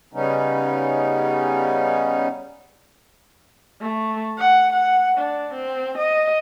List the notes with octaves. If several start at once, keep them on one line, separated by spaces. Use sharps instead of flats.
C#3 G3 B3 C#4 D#4
A3
F#5
F#5
D4
C4
D#5